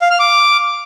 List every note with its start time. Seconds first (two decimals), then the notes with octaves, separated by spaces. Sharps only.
0.01 F5
0.10 F6
0.19 D6